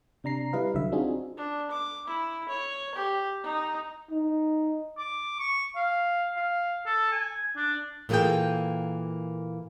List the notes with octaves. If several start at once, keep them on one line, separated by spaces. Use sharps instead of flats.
C3 D4 A#5 C7
G3 E4 B4 D#5 F5
C2 D3 F#3 E5
C4 D4 D#4 F4 F#4 G#4
D4
D6
E4
C#5
G4
D#4
D#4
D6
C#6
F5
F5
A4
G#5
D4
A#2 E3 A#3 G#4 A4 G5